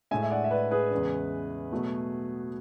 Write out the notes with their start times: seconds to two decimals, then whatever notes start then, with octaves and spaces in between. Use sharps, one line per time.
0.11 A2 G#3 E5 G#5
0.22 E5
0.31 D5 F#5
0.44 E5
0.51 B4 D5
0.71 G#4 B4
0.91 E2 C#3 E3 G#3
1.72 B2 F#3 A3